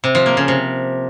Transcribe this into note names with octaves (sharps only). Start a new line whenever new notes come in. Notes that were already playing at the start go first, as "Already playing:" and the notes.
C3
F3
A#3
C#3
C3